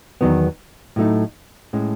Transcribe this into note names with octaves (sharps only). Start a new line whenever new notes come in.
E2 D#3 F#3 B3
A2 F#3 A3 D#4
A2 G#3 C#4